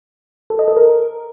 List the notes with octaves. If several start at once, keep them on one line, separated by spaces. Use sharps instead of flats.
A4
D#5
A4
A#4